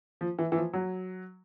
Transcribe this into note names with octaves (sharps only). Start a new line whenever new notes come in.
F3
E3
E3
F3
F#3